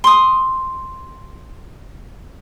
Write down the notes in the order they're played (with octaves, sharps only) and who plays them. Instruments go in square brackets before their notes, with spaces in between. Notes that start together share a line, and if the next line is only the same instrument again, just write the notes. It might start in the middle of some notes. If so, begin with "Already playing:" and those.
[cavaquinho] C6 D#6